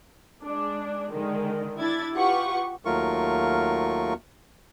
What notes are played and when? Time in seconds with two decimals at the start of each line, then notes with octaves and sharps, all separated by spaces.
0.43 G#3 D4
1.13 D3 D#3 G#3
1.79 D4 E4 G#6 A6
2.15 F4 G4 B4 F#5 C#6
2.85 D#2 F#3 A3 F4 A#4 C#6